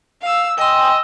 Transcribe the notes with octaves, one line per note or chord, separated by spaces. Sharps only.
F5 E6
D#5 G5 G#5 C6 E6